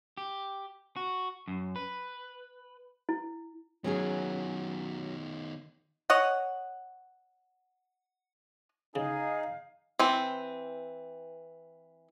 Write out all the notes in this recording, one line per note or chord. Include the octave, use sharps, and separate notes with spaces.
G4
F#4
F#2
B4
E4
D#3 F#3 B3 C#4 G#4
C#5 D#5 F#5
C#3 D#4 G#4 F5
E3 C4